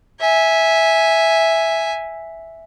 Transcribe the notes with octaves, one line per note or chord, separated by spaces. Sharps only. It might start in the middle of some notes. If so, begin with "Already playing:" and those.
E5 G#5